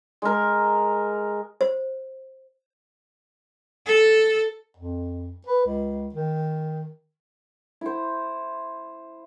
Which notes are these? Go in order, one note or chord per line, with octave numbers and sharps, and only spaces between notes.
G#3 A#4
C5
A4
F2
B4
C#2
D#3
E4 C5